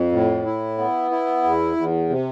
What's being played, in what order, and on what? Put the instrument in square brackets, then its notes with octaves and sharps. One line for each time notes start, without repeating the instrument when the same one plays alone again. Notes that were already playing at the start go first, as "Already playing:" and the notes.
Already playing: [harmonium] F2
A2
E4
B3
E4
E2
E2
C3